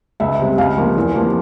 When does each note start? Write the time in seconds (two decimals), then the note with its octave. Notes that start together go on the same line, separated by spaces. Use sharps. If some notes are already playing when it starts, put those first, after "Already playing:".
0.20 C#2 E5
0.39 C3 G3 C4
0.58 C#2 F5
0.77 C3 F3 A#3
0.96 E2
1.15 C3 F3 A#3